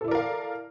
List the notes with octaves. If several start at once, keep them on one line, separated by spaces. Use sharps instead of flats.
E4 A4 A#4 D5 F5